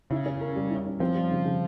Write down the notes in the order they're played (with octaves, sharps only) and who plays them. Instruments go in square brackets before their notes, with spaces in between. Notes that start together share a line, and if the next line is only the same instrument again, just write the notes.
[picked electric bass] C#3 [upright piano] E4
[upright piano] C#4
A#4
G3
E4
C#4
[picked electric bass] F3 [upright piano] C4
[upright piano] G3
C#3
C#3